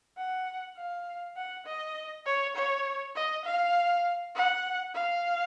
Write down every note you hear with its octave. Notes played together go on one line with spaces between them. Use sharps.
F#5
F5
F#5
D#5
C#5
C#5
D#5
F5
F#5
F5